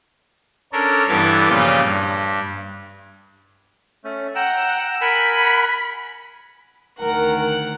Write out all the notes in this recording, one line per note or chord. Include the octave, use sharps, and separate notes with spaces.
C#4 D4 A4 A#4
G2 E3 B3 A4 D6 G#6
A#2 C#3 F3 G3 F4
G2
A3 C#4
F#5 G5 A#5 E6
A#4 F#5 G#5 B5
D2 D#3 A#4 F#5